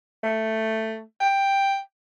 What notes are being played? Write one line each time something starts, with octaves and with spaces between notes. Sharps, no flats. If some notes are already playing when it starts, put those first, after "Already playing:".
A3
G5